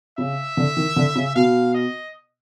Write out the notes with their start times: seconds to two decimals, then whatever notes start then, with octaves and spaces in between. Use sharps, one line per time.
0.18 C#3 E5
0.57 D3
0.77 D#3
0.96 D3
1.15 C#3
1.35 B2 F5
1.74 D#5